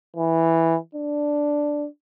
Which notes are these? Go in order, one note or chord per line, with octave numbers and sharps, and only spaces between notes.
E3
D4